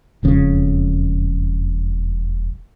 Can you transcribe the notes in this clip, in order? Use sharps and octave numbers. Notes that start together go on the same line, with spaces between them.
E1 F2 C#3